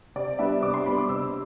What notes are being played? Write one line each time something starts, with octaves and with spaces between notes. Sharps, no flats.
C3 D5
G3 B3 D4 E5
C3 D6
C6
G3 B3 D4 B5
D6
C3 E6